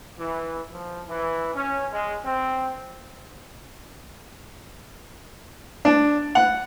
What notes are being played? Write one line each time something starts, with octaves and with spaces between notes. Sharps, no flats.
E3
F3
E3
C#4
G#3
C4
D4
F#5